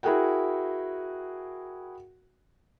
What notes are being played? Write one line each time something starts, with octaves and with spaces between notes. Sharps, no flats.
E4 F#4 G#4 A#4 F#5 G5